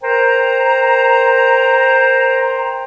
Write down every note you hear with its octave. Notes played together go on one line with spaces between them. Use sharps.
A#4 C5 G5 A#5